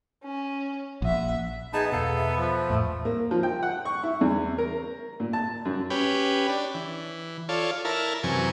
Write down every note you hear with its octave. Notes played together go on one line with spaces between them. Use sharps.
C#4
A#1 E5 F#5
B3 D#4 G#4 A5
E2 B2 A4 F5
E5
F3
E2 A2 A3
A#3
F3
G5
F#5
C#6
E4
E2
A#4
A#2
A5
F#2
C#4 G4 B4
D4
E3
F4 A4 C#5 D5
E4 A#4 A5
F#2 C3 E3 G#5 C#6